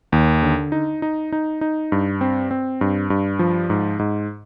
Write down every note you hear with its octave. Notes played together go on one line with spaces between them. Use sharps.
D#2
D3
D#4
D#4
D#4
D#4
G2
C4
C4
G2
G2
F3
G#2
G#2